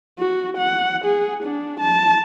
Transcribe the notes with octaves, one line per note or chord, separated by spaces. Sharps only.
F#4
F#5
G#4
D4
A5